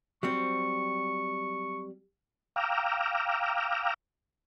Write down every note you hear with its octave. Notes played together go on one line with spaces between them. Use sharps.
F#3 G3 C4 C#6
F5 G5 A#5 D6 E6 F6